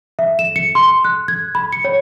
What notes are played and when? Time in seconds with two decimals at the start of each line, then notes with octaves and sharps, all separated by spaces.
0.19 E5
0.39 E7
0.56 C#7
0.75 C6
1.05 F#6
1.28 G#6
1.55 B5
1.73 C#7
1.84 C#5